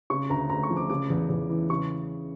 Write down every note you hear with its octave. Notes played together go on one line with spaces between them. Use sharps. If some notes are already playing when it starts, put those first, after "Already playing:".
C#3 C#6
D2 A#5
D2 A#5
C#6
F3
D6
C#3 D6
E2
E2
E3
C#3 C#6